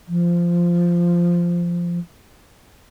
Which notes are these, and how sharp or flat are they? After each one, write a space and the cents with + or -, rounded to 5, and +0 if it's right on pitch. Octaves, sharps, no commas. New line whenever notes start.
F3 -10